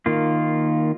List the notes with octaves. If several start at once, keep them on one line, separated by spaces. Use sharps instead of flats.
D#3 A#3 F4